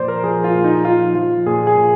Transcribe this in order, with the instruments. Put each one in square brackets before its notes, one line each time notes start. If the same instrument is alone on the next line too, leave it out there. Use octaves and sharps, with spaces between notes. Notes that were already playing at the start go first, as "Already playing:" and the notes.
Already playing: [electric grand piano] A#2 F3 C5 D5
A#4
F3 G#4
F4
A#2
D#4
F3 F4
F3 F4
A#2 G#4
G#4
A#2